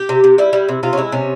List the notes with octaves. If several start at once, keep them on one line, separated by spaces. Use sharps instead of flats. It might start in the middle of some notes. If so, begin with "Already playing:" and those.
Already playing: G4
C3
C3
G3 E4
G3
C3
C3 F4
C#4
G#3 E4
C3 C#4